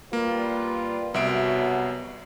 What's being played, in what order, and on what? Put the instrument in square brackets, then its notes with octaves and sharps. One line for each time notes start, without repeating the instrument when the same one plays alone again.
[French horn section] G3 F4 B4 [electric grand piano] A#3
[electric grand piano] C2 E5 D7 [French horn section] B2 F#3 B3